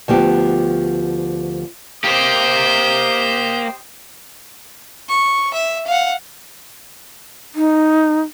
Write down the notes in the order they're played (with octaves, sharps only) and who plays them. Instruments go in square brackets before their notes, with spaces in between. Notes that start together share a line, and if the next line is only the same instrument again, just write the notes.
[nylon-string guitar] D2 F3 B3 G4
[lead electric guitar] A#3 [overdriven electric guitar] G4 C5 [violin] D#5 G6
[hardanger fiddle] C#6
E5
F5 F#5
[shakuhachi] D#4